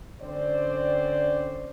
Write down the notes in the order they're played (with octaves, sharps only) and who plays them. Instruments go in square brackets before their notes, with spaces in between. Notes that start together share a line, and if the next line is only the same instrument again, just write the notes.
[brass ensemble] D3 C4 C#4 C5 D5